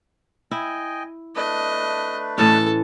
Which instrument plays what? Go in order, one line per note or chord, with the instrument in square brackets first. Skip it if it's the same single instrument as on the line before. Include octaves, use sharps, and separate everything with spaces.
[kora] E4 [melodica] D#5 G5 G#5
[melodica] A3 D4 B4 [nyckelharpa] D#5
[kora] A2 E3 C#4 [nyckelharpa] A4 A5